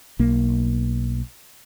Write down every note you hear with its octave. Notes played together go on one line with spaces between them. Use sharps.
B1 A#3